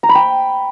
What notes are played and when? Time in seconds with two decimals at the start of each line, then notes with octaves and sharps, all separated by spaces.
0.03 A#5
0.09 B5
0.15 G5